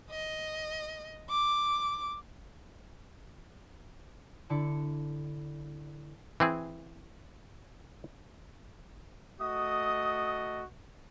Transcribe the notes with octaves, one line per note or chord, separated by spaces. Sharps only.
D#5
D6
D3 D4 E4 A5 C#7
E3 C4 G#4
A3 F#4 D#5 D#6